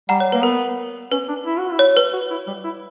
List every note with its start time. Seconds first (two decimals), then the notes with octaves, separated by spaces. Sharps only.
0.09 G3 F#5 A#5
0.20 C#5
0.32 A#3 B4
0.43 B3 A#4
1.12 C#4 B4
1.28 D4
1.46 E4
1.59 F#4
1.72 E4
1.79 C#5
1.97 B4
2.13 F#4
2.31 E4
2.47 G3
2.64 E4